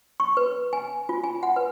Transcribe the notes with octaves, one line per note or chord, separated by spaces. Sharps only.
C#6
B4
G#5
F4
G#5
F#5
B4